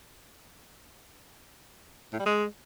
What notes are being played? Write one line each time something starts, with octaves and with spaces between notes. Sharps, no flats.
A2
G3
G#3